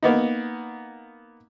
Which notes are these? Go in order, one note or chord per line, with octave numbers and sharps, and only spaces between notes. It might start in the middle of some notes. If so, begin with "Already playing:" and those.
A#3 B3 D#4